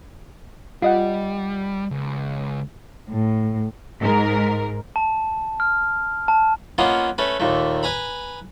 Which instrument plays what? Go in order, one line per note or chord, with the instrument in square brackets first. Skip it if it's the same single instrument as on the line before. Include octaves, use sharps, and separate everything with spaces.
[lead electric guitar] G3 [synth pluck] F4 D#5 F#5
[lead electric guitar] C#2
[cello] A2
[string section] G#2 A#4
[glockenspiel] A5
F6
A5
[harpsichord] A#3 B3 C#4 F4 D#5
A3 C#4 B4
D#2 A#2 A3
B4 G#5 A#5 B5